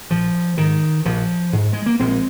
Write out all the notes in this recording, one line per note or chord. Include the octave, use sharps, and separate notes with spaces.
A#1 F3
G#2 D#3
A#1 F3
G#2
G#3
A#3
A#1 G#3 C4